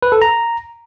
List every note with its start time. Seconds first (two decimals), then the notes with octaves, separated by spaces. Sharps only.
0.02 B4
0.12 A4
0.22 A#5